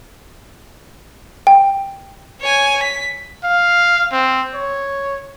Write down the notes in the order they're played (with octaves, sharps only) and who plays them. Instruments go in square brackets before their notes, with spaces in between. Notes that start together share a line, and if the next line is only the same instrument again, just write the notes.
[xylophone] G5
[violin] C#5 G#5
B6
[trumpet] F5
C4
C#5